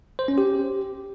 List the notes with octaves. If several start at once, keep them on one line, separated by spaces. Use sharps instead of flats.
C5
C#4
G4